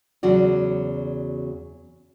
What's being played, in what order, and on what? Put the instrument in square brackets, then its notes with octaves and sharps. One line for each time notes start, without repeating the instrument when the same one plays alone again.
[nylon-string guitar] E2 C#3 F#3 F#4 D5